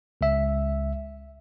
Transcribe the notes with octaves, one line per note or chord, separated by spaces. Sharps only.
C#2 E5